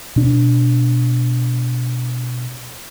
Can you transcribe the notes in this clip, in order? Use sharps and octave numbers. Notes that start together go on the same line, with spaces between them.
B2 D4